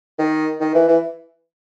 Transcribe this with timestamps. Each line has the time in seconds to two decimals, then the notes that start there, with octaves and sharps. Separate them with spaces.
0.19 D#3
0.60 D#3
0.74 E3
0.88 E3